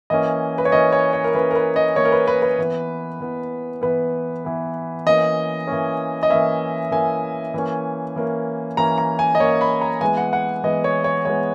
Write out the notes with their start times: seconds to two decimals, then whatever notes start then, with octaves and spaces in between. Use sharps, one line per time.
0.10 E3 A#3 C#4 D#5
0.58 B4
0.65 C#5
0.72 E3 A#3 C#4 D#5
0.93 C#5
1.13 C#5
1.24 A#4
1.34 E3 A#3 C#4 B4
1.51 A#4
1.55 B4
1.76 D#5
1.96 E3 A#3 C#4 C#5
2.05 A#4
2.12 B4
2.27 B4
2.42 B4
2.58 E3 B3
3.20 E3 B3
3.82 E3 B3 B4
4.45 E3 B3
5.06 E3 A#3 C#4 D#5
5.67 E3 A#3 C#4
6.23 D#5
6.30 E3 A#3 C#4 E5
6.91 E3 A#3 C#4 G#5
7.54 E3 A#3 C#4
8.16 E3 A#3 C#4
8.77 E3 A#3 C#4 A#5
8.98 A#5
9.19 G#5
9.35 D#5
9.40 E3 A#3 C#4 C#5
9.61 B5
9.81 A#5
10.01 E3 G#3 B3 G#5
10.17 F#5
10.33 F#5
10.64 E3 G#3 B3 D#5
10.84 C#5
11.04 C#5
11.25 E3 G#3 B3 C#5